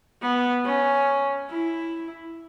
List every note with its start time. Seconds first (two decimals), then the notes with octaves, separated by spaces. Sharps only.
0.22 B3
0.65 C#4
1.50 E4